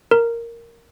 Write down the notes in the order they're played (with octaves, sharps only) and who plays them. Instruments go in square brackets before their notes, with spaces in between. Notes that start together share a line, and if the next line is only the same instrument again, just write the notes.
[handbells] A#4